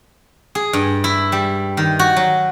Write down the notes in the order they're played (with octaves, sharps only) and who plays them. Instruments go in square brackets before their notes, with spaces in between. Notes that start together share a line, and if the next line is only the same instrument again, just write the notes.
[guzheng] G#4
G2
E4
G3
D#3
F#4
F#3